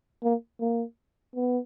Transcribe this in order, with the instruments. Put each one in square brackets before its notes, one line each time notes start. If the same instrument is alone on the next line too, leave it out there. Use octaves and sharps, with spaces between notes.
[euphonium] A#3
A#3
B3